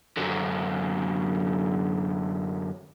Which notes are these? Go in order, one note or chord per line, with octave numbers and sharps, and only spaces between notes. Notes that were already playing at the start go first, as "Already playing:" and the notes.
F#2 D3